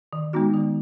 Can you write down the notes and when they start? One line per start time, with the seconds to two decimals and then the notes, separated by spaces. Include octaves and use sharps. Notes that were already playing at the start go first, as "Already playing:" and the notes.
0.13 D#3
0.33 G#3 B3 D#4 F#4
0.54 D#3